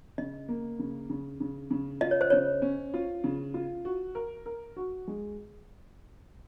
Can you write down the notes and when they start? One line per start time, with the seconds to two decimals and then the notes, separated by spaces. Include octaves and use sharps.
0.18 C#3 D#5
0.48 A#3
0.79 C#3
1.10 C#3
1.40 C#3
1.71 C#3
2.01 F4 D#5
2.11 C#5
2.21 C5
2.30 C#3 C#5
2.62 C#4
2.94 F4
3.24 C#3
3.54 F4
3.85 F#4
4.15 A#4
4.46 A#4
4.76 F#4
5.07 G#3